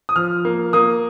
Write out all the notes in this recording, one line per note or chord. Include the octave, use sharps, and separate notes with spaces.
D#6
F3 F6
A#3
A#3 D#6